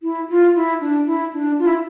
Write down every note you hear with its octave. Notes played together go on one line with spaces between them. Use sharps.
E4
F4
E4
D4
E4
D4
F4
E4